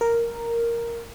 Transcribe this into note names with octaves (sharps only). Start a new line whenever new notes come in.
A#4